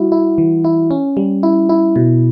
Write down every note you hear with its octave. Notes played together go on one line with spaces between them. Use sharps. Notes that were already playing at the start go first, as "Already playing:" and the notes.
Already playing: G3 E4 F#4
E4
E3
E4
C#4
G3
E4
E4
B2